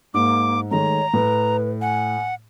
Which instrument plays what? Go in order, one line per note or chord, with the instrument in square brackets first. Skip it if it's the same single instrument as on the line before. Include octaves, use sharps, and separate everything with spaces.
[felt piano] G#2 [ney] A#3 [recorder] D6
[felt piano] D#3 G#3 A3 [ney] C#5 [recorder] A#5
[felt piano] A2 [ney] B4
[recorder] F#5 [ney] G#5